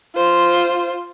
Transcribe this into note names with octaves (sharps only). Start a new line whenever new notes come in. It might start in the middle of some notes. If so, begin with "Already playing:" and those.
F4 C5